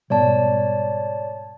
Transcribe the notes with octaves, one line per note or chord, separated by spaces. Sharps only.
G#2 B2 G3 C#5 D5 A5